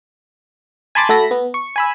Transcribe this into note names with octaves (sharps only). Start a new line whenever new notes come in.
G#5 A5 B5 C6 D6 A6
A3 F#4 A4 E5 B5 A#6
B3
C#6
G#5 B5 E6